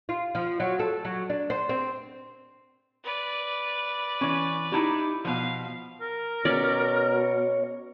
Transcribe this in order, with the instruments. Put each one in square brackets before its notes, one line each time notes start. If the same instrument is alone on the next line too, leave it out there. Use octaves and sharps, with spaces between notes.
[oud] F4
F3
F#3
A4
F#3
D4
C5
C4
[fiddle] B4 D5
[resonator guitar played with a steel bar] E3 C#4
D#4 E4 G4
[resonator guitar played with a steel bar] B2 F3 [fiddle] F5
[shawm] A#4
[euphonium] B2 [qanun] C#4 D5 [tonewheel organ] C#5